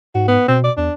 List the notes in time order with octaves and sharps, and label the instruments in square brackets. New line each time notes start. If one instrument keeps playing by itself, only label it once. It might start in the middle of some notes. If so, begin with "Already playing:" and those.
[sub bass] G#2 [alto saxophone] F#4
[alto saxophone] B3
[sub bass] B2 [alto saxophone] C4
[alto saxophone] D5
[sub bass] E2 [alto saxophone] D4